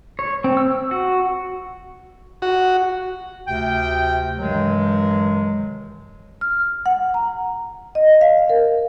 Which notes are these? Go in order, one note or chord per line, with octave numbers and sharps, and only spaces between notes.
C#5
C4
E6
F#4
F#4
D2 C3 G5
G2 C3 D#3 E3 F#3 G#3
F6
F#5
A#5
D#5
F5
A#4